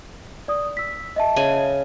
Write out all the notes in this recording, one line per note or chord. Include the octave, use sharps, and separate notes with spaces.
D5 D#6
E6 B6
D#5 E5 A5
C#3 G#5